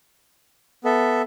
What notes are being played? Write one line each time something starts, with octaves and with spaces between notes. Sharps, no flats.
B3 A4 E5